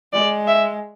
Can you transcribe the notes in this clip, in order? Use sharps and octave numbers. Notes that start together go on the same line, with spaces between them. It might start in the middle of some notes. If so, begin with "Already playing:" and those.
G#3 D5
E5